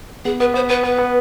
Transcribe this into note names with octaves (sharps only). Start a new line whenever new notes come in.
B3 G#4
B3 B4
B3 C5
B3 B4
B3 B4
B3